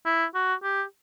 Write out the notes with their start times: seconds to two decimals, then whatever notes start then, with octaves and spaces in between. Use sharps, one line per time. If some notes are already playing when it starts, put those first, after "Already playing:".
0.06 E4
0.35 F#4
0.63 G4